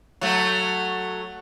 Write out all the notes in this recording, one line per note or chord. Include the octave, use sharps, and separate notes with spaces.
F#3 A3